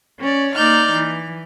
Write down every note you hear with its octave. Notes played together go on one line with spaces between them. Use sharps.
C#4 C#5 D5
A#3 D#4 D5 F6 G6
E3